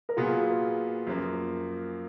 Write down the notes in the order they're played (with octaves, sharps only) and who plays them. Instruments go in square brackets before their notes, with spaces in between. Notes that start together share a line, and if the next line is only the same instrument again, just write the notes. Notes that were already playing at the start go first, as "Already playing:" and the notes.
[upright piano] A#4
[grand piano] A#2 F#3 B3 [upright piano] F4 G#4
[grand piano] F#2 F3 A#3